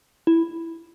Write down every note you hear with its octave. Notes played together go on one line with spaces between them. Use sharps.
E4